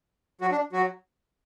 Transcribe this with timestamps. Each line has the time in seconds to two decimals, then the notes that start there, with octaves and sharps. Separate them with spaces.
0.41 F#3 F#4
0.52 D4
0.73 F#3 F#4